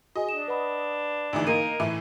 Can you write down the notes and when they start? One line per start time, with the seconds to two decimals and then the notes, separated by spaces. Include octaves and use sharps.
0.16 F#4 G#4 D#5 G#5
0.29 D4 E7
0.48 B4 F#5 B5
1.33 D2 G#2 E3
1.47 A#3 D#4 A#4 D#7
1.80 A2 E3 A3